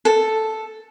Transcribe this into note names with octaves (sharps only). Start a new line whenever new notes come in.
A4